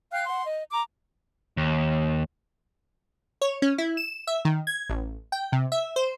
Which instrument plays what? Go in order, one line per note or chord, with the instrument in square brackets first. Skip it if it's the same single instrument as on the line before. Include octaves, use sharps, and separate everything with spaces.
[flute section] F5 G5 F6 F#6
F#5 C6
D#5
A#5 D6
[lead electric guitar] D#2
[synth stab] C#5
C#4
E4
E7
E5
D#3
G#6
A1
G5
C3
E5
C5